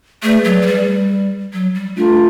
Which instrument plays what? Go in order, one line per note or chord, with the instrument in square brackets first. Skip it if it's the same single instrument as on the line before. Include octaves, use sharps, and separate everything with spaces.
[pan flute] A3 [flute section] G#4 B4 D5
[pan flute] F#3
F#3
G3
F#3
G3
[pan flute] A3 [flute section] D4 F4 A4